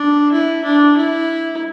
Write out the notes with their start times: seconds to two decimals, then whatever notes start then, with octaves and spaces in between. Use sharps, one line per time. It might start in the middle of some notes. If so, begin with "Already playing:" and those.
Already playing: D4
0.32 E4
0.65 D4
0.97 E4